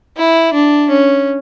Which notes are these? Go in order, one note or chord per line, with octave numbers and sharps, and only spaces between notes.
E4
D4
C#4